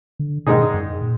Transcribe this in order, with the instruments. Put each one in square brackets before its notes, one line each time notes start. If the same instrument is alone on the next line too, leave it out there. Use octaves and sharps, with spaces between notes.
[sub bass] D3
[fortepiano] G#2 D#3 G#3 D#4 G#4 [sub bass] B2
[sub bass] F#2
A#2